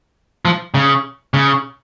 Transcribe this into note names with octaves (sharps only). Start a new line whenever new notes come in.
F3
C#3
C#3